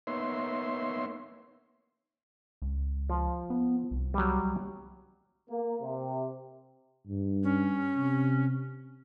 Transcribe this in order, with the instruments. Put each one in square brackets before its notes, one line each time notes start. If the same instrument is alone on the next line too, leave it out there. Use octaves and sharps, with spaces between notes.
[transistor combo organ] A#3 B3 D#4 C#5 E5 C6
[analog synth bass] C#2
[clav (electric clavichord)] F3
[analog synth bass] B3
C2
[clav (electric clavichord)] F#3 G3
[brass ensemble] A#3
C3
[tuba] G2
[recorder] C#4
[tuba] C3